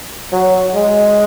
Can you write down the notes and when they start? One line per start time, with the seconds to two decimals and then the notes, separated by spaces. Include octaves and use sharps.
0.32 F#3
0.75 G#3